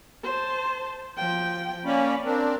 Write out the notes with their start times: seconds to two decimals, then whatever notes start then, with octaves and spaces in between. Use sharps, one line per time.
0.23 C5 A5
1.17 F3 G5
1.85 A#3 C#4 D5 B5
2.24 C4 D4 A#4